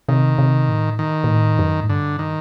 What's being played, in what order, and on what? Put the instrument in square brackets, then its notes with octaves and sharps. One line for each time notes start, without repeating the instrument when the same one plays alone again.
[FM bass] C3 [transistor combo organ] D#3
[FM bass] C3
A2
[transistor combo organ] D#3
[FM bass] A#2
A2
F#2
A2
[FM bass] G2 [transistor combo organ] D3
[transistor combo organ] D#3